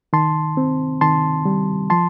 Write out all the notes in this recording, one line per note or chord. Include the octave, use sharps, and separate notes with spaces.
D#3 A5 C6
C4
D#3 A5 C6
G3
F3 A5 C6